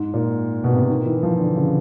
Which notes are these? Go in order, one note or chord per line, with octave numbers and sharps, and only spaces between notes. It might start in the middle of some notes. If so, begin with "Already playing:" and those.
Already playing: G#2
A#2
B2
C3
B2
D#3
E3
F3
D3
C#3